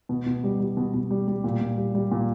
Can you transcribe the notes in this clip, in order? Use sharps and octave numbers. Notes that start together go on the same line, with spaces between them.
B2
B2
G3
G3
B2
B2
G3
G3
A#2
A#2
G3
G3
A#2